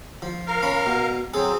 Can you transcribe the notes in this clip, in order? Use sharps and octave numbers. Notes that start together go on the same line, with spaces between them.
F3
A#4 F5
C#4 B5
B2
F#3 C4 G#4 A4